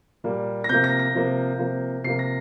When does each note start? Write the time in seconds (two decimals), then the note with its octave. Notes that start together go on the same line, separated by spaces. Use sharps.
0.24 A#2 G3 A#3
0.64 A#6
0.69 C3 F3 A#3 G6
0.84 A#6
0.99 A#6
1.14 C3 F3 A#3
1.59 C3 F3 A#3
2.04 C3 F3 A#3 C7
2.19 A#6